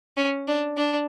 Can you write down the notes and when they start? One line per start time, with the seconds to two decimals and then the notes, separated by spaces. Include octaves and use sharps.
0.17 C#4
0.48 D4
0.77 D4